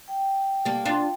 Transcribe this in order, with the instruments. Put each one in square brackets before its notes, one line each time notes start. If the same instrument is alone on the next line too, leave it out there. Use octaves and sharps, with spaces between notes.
[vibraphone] G5
[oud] G3 A#3 [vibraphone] A5
[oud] D4 F4 [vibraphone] A5
[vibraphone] A5